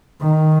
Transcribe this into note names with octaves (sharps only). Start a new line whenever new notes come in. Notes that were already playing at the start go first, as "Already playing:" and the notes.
D#3